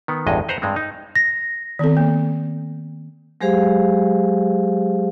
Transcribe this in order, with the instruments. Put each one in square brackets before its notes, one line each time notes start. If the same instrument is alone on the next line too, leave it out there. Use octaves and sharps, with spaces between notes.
[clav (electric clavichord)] D#3 B3
A1 E2 G2 G#3 D#5
B4 C5 F#5 A#5
G2 G#3 C4
D#4
[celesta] A#6
[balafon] D#3 B3 C4 A4
A#3
[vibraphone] F#3 G#3 G4 G#4 C5 F5